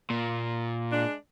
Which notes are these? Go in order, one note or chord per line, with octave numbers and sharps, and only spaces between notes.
A#2
G#3 D4